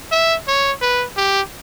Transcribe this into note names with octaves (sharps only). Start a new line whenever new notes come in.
E5
C#5
B4
G4